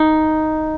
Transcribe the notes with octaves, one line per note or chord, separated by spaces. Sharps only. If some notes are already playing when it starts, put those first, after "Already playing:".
Already playing: D#4